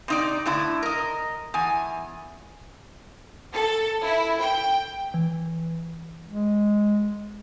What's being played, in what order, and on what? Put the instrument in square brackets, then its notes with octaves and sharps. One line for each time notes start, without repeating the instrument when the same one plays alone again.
[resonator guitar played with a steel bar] C3 D#4 D5
A2 D3 E4
A#4 D#5
E2 G#5
[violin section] A4
E4
G5
[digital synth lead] E3
[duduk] G#3